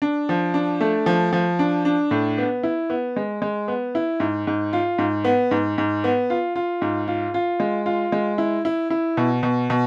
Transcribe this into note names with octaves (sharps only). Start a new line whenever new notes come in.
D4
F3
D4
A3
F3
F3
D4
D4
A2
B3
E4
B3
G#3
G#3
B3
E4
G#2
G#2
F4
G#2
B3
G#2
G#2
B3
F4
F4
G#2
F4
F4
G#3
F4
G#3
E4
E4
E4
B2
B2
B2